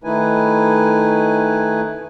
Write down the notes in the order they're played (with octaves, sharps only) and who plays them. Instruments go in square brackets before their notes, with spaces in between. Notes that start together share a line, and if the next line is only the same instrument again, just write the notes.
[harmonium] D#3 A3 D#4 E4 B4 G#5